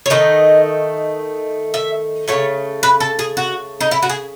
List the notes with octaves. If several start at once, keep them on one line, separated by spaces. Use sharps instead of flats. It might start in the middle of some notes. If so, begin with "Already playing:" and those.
C#5
D#3 A3 D#4 D#5
E5
C#3 F#3 A3 C#5
B4
A4
G#4
F#4
D#4
E4
F#4
G#4